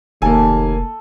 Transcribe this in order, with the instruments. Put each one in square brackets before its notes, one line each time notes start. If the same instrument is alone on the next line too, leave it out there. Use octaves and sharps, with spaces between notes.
[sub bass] F1 [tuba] D#2 [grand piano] A#3 G#5 [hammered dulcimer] A4